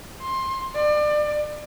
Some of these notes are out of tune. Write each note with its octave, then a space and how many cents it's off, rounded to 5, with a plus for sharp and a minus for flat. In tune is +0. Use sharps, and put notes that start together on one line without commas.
C6 +20
D5 +30